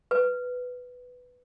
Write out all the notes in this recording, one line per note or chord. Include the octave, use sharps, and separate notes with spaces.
B4